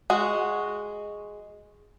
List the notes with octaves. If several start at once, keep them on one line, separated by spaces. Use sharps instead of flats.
G#3 F#4